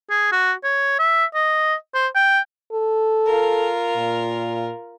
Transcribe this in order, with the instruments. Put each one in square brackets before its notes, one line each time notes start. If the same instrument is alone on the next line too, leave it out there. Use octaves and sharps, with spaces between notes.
[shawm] G#4
F#4
C#5
E5
D#5
C5
G5
[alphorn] A4
[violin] F4 A#4
[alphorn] A#2